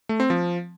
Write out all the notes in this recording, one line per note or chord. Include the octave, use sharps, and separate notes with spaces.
A3
C4
F3